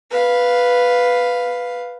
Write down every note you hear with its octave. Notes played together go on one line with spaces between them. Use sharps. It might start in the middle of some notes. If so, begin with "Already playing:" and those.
B4 F5